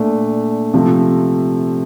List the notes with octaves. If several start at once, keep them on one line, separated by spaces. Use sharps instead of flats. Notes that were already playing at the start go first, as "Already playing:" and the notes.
Already playing: A#2 A3 D4
C3 F3 A3